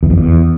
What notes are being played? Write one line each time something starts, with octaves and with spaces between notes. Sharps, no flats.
E2
F2
E2